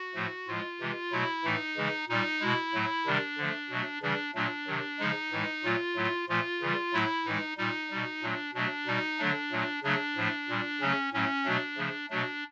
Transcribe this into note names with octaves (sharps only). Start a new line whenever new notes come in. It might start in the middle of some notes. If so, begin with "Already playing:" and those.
Already playing: F#4
A2 F3 A3
A2 F3 G#3 F4
C3 E3 G#3
B2 F#3 A3 E4
A2 E3 A3 D#4
C#3 E3 G#3
A#2 G3 D#4
B2 G#3 E4
A2 F#3 A3
C3 D#3 G3 D4
D3 F3 A3
B2 F#3 A3
C#3 E3 G3 D4
A#2 F#3 A3 D4
C3 D#3 F#3
C#3 F3 G#3 D#4
A2 E3 G#3
A#2 F#3 A3 F4
A2 F#3 A3
A#2 F3 A3 F4
C#3 E3 G3
A2 F#3 A3 E4
A2 E3 G#3 D#4
A#2 G3 D#4
B2 G3
A#2 F#3 A3 D4
B2 F#3 A3 D4
B2 G3 D#4
D3 F#3 A3 D4
A#2 F#3 A3
C#3 F#3 A3 D4
A2 F3 A3
A#2 G3
C#3 F#3 A3 C#4
A2 F#3 A3 C#4
B2 F#3 A3 D4
C#3 F3 A3
B2 F#3 A3 D4